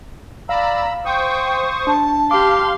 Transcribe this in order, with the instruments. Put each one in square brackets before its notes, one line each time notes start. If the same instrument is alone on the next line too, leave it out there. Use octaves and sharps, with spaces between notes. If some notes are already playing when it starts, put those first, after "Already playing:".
[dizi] D5 [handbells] F5 [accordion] A#5 B5 E6
[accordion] C5 C#6 D#6 [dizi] G5
[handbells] D4 [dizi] A5
[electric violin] G4 C6 [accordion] F5 [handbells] D6